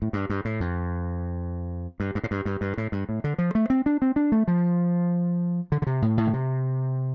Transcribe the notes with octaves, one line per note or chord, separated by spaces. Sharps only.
A2
G2
G2
A2
F2
G2
G2
A2
G2
G2
G2
A2
G2
A2
D3
F3
A3
C4
D4
C4
D4
A3
F3
D3
D3
C3
A2
A2
D3
C3